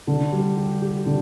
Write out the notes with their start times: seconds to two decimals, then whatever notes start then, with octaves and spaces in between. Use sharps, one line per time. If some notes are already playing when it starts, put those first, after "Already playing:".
0.07 D3
0.32 G3
0.57 G4
0.82 G4
1.06 D3